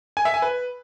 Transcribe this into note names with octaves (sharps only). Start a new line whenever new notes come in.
G#5
E5
G#5
B4